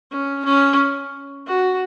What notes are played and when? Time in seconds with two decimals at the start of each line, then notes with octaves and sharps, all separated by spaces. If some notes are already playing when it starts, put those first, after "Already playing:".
0.11 C#4
0.45 C#4
1.47 F#4